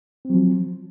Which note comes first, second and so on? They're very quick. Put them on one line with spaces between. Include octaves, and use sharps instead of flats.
C4 F#3 F3